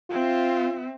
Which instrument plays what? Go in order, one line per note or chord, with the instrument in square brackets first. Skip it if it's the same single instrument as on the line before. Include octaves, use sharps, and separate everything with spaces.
[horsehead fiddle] C4 E5 [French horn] F4